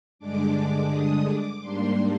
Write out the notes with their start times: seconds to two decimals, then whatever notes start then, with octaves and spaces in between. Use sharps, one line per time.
0.19 G2 D3 G#3 D4 D6
0.89 D#6
1.25 D6
1.60 G#2 G3 A#3 D4 C6